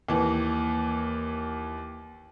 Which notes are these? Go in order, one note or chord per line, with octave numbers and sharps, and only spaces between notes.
D#2 E3